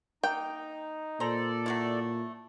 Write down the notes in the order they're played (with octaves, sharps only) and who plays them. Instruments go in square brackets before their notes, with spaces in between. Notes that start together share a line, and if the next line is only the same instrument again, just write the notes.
[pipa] A#3 [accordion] D#4 [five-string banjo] G5
[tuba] A#2 [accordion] A4 D5 [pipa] C5 A#5
[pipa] F#3 A3 E4